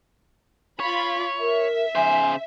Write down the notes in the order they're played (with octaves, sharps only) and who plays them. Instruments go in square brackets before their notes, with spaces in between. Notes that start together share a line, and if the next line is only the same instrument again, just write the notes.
[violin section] F4 B5 [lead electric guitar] C#5
[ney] A#4 [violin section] E5
[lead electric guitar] C#3 C5 [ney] G#5